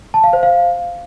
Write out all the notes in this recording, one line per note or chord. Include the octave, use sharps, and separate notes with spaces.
A5
F5
C5
F5